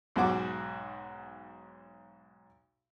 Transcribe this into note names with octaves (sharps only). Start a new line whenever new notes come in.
B1 G#2 F#4 D6